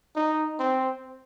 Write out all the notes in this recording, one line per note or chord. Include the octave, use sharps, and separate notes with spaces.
D#4
C4